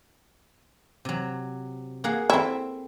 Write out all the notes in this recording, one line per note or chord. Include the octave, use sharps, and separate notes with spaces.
C3 F#3
A#3 G#4 F#5
C4 E4 A4